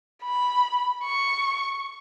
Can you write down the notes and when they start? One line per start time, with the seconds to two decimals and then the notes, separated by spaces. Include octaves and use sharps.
0.24 B5
1.04 C#6